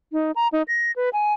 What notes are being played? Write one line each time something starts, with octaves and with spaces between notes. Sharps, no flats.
D#4
A#5
D#4
A#6
B4
G#5